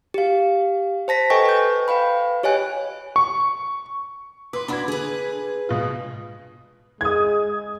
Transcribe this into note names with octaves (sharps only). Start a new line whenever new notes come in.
G4 F5
C5 A5 A#6 B6
A4 B4 D#5 G5 G#5 C#6
B4 G6
B4 F5 G5 B5
G4 C#5 D#5 G#5 F#6
C#6
B4 C6 D6
D4 E4 F#4 B5 D6 G#6
D3 G#4 B4
C#2 B2 F4
G#3 D#6 G#6